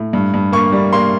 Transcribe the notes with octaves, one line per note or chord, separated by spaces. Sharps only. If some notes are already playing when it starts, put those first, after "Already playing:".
Already playing: A2
G2
G2
A#3 C#6
G3
A#3 C6